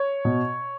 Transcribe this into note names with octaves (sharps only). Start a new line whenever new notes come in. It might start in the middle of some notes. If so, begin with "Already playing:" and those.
Already playing: C#5
B2